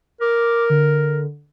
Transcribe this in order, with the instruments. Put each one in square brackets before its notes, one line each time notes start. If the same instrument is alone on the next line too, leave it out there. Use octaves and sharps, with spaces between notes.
[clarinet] A#4 [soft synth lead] D6
[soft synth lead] D3